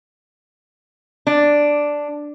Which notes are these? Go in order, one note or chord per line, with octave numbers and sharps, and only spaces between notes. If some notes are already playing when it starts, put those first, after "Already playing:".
D4